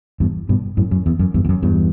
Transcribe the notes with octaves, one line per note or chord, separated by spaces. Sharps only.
E2 G2
G2 B2
F#2 A2
F#2
E2
F#2
E2 G2
E2
F#2
E2 G2